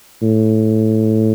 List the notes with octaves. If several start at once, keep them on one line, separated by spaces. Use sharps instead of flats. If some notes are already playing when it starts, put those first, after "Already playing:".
A2